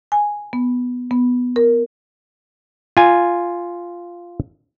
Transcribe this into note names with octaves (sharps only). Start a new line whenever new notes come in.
G#5
B3
B3
A#4
F4 G#5